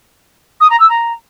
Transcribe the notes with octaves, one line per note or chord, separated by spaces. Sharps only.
D#6
A#5
E6
A#5